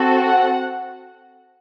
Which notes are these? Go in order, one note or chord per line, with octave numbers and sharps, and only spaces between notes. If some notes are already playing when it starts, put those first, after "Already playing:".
Already playing: C4 F#4 A4
F#5